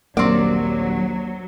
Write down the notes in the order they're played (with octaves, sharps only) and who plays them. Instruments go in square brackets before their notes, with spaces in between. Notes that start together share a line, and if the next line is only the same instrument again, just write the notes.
[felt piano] D#1 A#1 F#5 [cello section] F#3 [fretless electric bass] A#3 [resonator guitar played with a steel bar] C4 D5